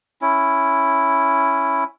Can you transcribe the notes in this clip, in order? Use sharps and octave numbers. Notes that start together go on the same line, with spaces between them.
C#4 E4